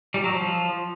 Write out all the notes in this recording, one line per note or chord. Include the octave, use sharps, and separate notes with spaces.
G3
F#3
F3